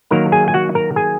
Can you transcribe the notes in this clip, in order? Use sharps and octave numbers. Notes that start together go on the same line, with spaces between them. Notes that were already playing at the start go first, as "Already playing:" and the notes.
D#3 F#3 A#3 A#4 A#5
G#4 G#5
G#5
F#4 F#5
A#4 A#5
G#4 G#5